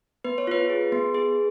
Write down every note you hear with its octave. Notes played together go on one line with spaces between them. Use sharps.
B3 B4
C#5
F4 B4
G#4
B3
G#4